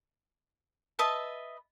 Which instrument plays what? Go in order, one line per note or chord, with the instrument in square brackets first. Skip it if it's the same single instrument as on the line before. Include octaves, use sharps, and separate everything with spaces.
[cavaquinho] B4 D#5 E5 A5